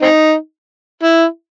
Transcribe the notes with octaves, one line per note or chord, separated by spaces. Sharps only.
C4 D#4
E4